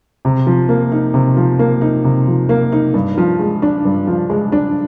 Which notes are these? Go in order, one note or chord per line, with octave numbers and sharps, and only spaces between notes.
C3
F3
A#3
D#4
C3
F3
A#3
D#4
C3
F3
A#3
D#4
G2
F3
G#3
D4
G2
F3
G#3
D4